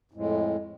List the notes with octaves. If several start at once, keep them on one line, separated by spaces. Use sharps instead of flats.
F2 A2 G#3